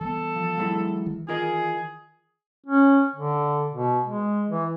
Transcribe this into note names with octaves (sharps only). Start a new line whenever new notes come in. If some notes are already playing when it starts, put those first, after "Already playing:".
E3 G3 B3 A4
F3
F#3 G#3 E4
D#3 E3
F4 G#4 A#4 D#5
C#4
D3
B2
G#3
E3